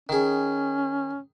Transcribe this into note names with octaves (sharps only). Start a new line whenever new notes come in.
D#3 C#4 G#4